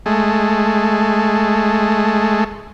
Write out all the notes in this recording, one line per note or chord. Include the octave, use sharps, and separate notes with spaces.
G#3 A3